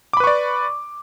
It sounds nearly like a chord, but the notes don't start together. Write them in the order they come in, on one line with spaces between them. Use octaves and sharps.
D6 B5 B4 C#6 D5